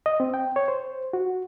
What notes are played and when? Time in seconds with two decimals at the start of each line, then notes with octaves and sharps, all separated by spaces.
0.06 D#5
0.20 C4
0.34 G5
0.56 C#5
0.68 C5
1.13 F#4